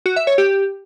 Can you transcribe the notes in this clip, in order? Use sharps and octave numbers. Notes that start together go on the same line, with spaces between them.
F#4
E5
C#5
G4